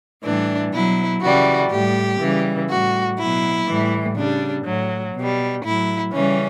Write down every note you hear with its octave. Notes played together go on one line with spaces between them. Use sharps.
A2 E3 G3 D4
B2 F#3 E4
C#3 E3 G3 F#4
A2 G3 G4
C#3 E3 G3
A2 G3 F#4
B2 F#3 E4
A2 E3 G3
C#3 G3 D4
A2 F#3
B2 G3
A2 F#3 E4
C#3 E3 G3 C#4